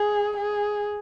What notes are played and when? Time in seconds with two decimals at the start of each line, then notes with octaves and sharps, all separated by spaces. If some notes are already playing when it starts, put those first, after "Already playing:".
Already playing: G#4
0.37 G#4